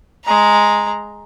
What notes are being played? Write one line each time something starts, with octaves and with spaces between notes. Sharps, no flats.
G#3 A#5